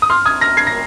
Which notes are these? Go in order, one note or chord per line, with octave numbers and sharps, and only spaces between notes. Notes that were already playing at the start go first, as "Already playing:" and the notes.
D#6
C6 F6
D#6 G#6
F6 A#6
G#6 C7
A#6